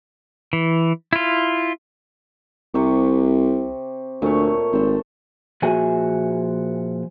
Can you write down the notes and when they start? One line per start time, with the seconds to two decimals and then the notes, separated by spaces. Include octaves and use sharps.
0.53 E3
1.13 E4 F4
2.74 C2 C3 C#6 D6
4.22 D2 A#2 A3 C#5
4.73 G#1 A4 C5
5.62 A#2 F3 F#4 G#4 E5 G#5